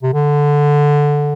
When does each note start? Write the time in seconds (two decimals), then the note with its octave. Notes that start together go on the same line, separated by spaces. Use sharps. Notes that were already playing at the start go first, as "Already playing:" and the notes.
0.03 C3
0.14 D3